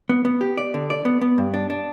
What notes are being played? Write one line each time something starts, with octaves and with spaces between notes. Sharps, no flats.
B3
B3
G4
D5
D3
D5
B3
B3
G2
D4
D4